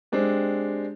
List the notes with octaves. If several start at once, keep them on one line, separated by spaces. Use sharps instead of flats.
G#3 C4 D4 G4